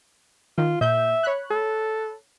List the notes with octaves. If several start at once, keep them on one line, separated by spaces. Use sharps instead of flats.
D#3 F4
A#2 E5 G6
C#5 B5 F#6
A4